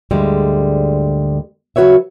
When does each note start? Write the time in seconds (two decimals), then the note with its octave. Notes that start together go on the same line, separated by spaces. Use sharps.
0.11 D2 G#2 D3 G3 G#3
1.76 C#3 F#3 F#4 B4 C#5 E5